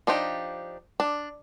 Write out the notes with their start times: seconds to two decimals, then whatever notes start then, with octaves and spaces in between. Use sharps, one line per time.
0.07 F3 D4 D#4 G4
1.00 D4